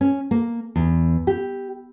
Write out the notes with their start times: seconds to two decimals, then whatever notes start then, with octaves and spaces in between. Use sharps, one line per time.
0.01 C#4
0.31 A#3
0.76 E2
1.27 G4